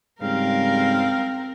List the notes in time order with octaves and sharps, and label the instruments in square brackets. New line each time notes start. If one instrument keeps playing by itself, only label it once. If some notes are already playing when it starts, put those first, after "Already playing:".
[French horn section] F2 C#3 G3 [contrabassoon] G#2 [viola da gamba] C4 A#4 [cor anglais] F5